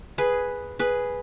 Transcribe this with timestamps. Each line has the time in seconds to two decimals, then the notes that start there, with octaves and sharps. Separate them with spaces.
0.18 G#4 B4
0.79 G#4 B4